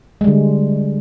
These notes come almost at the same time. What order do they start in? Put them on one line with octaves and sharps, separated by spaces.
G#3 G3 D3